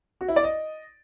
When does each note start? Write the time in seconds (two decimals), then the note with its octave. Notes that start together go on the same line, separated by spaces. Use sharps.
0.21 F#4
0.28 E4
0.36 D5
0.44 D#5